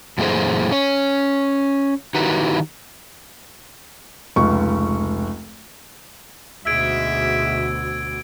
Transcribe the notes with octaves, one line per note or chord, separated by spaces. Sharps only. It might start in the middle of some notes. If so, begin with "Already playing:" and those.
F#2 A#2 E3 A3 G#4 C5
C#4 C#5
D#3 D#4 E4 F#4 G4 B4
F1 C#2 C#6
D2 G#2 B2 G#3 E5 E6 G#6 D7